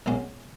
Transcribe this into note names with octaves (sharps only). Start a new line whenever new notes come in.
B1 A#2 G#3 C#4 F#4